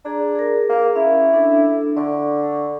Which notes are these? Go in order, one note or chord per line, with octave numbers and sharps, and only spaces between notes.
D4 G#4 A#5
G#4 A#4
A#3
C#4 E4
D4 A4
D3 D5 C#6